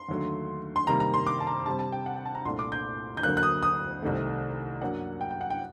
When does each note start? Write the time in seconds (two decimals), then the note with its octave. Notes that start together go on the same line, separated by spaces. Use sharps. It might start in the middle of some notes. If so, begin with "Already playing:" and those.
Already playing: C6
0.09 D#2 D3 F#3 A3
0.76 C6
0.87 C3 D#3 G3 A#3 A#5
1.00 A#5
1.14 C6
1.27 D6
1.40 A5
1.47 A#5
1.66 C3 G3 C4 A5
1.79 A5
1.92 G5
2.06 F#5
2.16 G5
2.25 A5
2.35 A#5
2.45 C2 A#2 A3 D4 C6
2.59 D6
2.72 G6
3.17 G6
3.23 D2 D3 F#3 A#3 F#6
3.37 F#6
3.43 D#6
3.63 D#6
4.02 C2 C3 D#3 A3
4.81 F#2 F#3 A#3 D4 F#5
5.21 G5
5.31 G5
5.41 F#5
5.50 G5